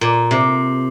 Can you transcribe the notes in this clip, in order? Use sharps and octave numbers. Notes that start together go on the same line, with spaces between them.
A#2
C3